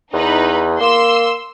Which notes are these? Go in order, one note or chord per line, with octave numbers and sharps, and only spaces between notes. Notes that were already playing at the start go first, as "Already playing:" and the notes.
E2 D#4 B4
A#3 C6 E6